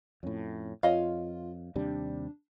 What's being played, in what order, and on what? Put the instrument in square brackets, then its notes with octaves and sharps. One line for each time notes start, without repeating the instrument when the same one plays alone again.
[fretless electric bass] F2 A2 [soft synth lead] C#4
[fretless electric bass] F2 [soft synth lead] F4 [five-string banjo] C#5 D#5 F5
[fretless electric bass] D#2 C3 G3 [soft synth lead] D4